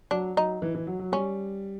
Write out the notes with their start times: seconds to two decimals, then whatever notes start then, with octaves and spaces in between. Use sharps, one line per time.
0.11 F#3 D4
0.37 F#3 D#4
0.62 E3
0.75 E3
0.87 F#3
0.99 F#3
1.12 G3 C#4